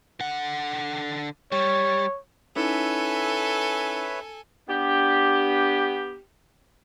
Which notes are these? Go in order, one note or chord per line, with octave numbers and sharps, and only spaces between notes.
D3 F#5
G3 C#5
C#4 D#4 E4 A4 B4 C#5 E5 G#5
B3 D4 G4